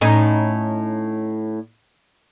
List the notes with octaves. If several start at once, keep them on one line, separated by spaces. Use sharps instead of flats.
A2 C#4 D#4